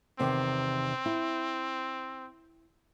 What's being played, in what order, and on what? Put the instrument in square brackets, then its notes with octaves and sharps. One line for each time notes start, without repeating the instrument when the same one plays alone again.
[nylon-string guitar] E2 C3 D#3 [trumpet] C4
[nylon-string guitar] E4